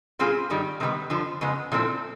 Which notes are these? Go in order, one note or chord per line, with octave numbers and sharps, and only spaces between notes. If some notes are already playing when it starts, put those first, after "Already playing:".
A#2 G3 C4 F4 G#4
G2 D#3 G3
C3 D#3 G3 B3
F2 D3 F3
F2 C#3 G#3 B3
A#2 F3 A3 C4 E4